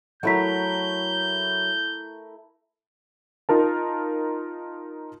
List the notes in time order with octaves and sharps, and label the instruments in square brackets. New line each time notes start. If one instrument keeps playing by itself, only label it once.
[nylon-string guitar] F#3 [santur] A3 E4 A#4 [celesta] F#5 B6 [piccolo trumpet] G6
[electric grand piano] D#4 F4 A#4 A5